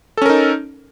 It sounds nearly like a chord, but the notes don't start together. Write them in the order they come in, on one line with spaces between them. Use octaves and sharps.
A4 C#4 A#4 D#4